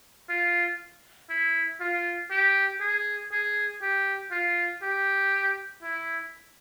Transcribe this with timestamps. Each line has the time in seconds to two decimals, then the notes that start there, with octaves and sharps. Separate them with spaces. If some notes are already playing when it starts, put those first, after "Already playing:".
0.29 F4
1.29 E4
1.80 F4
2.31 G4
2.81 G#4
3.32 G#4
3.81 G4
4.31 F4
4.83 G4
5.83 E4